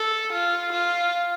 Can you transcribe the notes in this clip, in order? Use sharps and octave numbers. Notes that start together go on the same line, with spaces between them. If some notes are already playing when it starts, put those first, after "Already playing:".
Already playing: A4
F4
F4